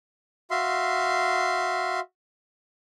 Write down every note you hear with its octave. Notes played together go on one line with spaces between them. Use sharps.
F#4 E5 F5 C6